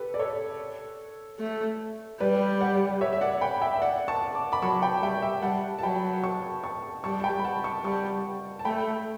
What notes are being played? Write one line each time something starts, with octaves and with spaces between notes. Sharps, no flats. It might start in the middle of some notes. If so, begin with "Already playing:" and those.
Already playing: G4 A4 B4
D5
A4 C#5
A3
G3 B4 D5
D5 F#5
C#5 E5
E5
D5 F#5
G5 B5
E5 G5
E5
D5 F#5
A5 C#6
D6
B5 D6
F#3 A5 C#6
G5 B5
G3 E5 G5
E5 G5
G3 F#5 A5
A5
F#3 G5 B5
A5 C#6
A5 C#6
G3 A5 C#6
A5
G5 B5
B5
F#5 A5
A5 C#6
G3 A5 C#6
A5
A3 G5 B5